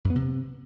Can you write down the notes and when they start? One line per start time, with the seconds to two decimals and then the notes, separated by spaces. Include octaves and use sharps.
0.05 F#2
0.10 B3
0.16 C3